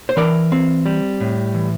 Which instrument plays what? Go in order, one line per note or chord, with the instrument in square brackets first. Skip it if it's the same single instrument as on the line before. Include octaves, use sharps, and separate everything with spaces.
[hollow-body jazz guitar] C5
E3 A#4 D5
C4
G3
A2
E3